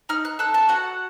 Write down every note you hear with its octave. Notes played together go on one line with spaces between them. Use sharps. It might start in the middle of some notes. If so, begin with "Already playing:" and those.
D#4 F6
F#6
A4 F#6
A5
F#4 F#5